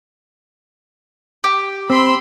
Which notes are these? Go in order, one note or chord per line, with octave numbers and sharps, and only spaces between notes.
G4
C4 B5 C6 E6